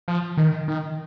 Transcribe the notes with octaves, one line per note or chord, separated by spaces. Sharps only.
F3
D#3
D#3